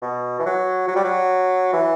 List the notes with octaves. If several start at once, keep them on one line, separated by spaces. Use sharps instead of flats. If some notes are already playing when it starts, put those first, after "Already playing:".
B2
E3
F#3
F#3
G3
F#3
E3